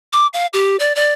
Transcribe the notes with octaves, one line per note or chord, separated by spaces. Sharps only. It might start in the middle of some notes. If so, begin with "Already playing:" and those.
D6
F5
G4
D5
D5